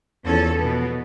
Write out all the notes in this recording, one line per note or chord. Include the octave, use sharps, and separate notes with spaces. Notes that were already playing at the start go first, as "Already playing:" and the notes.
E2 F3 C#4 A4
B2 B3